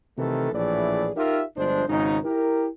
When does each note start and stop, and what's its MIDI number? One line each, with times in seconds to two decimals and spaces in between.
0.18 0.52 48
0.18 0.52 51
0.18 0.52 52
0.18 0.52 57
0.18 0.52 69
0.53 1.11 34
0.53 1.11 45
0.53 1.11 52
0.53 1.11 68
0.53 1.11 74
1.16 1.43 63
1.16 1.43 65
1.16 1.43 67
1.16 1.43 70
1.16 1.43 76
1.57 1.85 31
1.57 1.85 53
1.57 1.85 56
1.57 1.85 62
1.57 1.85 72
1.89 2.18 32
1.89 2.18 44
1.89 2.18 49
1.89 2.18 63
2.24 2.67 64
2.24 2.67 67
2.24 2.67 70